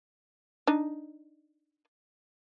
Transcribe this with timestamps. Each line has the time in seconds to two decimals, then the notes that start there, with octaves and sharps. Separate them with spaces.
0.67 D4 D#4